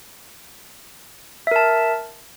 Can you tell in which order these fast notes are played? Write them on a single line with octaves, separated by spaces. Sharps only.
E5 A#4 A5